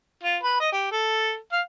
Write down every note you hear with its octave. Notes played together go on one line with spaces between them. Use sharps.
F4
B4
D#5
G4
A4
F5